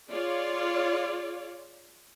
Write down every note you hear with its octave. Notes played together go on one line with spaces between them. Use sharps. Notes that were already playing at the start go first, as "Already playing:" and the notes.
F4 G#4 C#5 D5